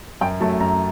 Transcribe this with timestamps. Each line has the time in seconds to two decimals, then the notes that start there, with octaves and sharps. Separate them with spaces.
0.21 F#2 G5
0.40 F#3 A3 A5
0.60 F#2 A#5